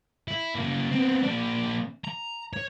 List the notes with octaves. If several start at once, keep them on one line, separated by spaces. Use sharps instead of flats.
E4
C#3 A#3
B3 C4
A#2 D4
A#5
C#5